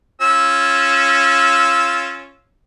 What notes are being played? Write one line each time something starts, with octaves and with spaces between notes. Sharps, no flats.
C#4 F4 E6